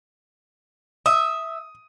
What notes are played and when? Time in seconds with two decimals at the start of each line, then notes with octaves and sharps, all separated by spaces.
1.06 E5 D#6